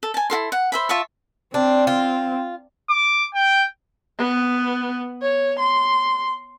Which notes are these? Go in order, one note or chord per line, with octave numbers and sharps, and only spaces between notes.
A4
G#5 A5
E4 F#4 A4 C6
F#5
C5 E5 B5
F4 E5 A5 C#6
C4 D4
F4
D6
G5
B3
C#5
C6